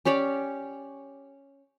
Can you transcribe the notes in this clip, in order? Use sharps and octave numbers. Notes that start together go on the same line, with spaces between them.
C#4 G4 C#5 D5